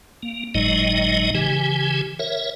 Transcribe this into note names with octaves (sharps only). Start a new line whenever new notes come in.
A#3
G1 A2 F#3 G#3 D#4 D#5
C#3 E3 G4 G#5
A#4 C#5 E5